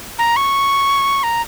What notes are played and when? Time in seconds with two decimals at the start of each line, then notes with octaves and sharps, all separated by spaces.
0.19 A#5
0.36 C#6
1.23 A#5